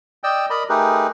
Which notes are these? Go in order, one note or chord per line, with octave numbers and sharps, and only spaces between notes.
D5 D#5 G5 E6
A#4 D5 D#5 A#5 B5
A3 D#4 G4 G#4 A#4 B4